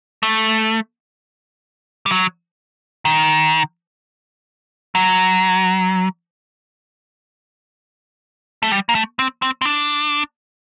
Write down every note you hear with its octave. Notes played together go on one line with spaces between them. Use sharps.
A3
G3
F#3
D#3
F#3
A3
G3
A#3
A3
C4
C4
C4
D4